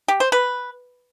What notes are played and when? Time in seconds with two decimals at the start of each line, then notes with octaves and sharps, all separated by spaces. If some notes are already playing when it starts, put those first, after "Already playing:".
0.08 G4
0.20 C5
0.32 B4